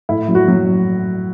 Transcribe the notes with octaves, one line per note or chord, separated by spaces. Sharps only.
A2 E4
F#3
F#4
F#3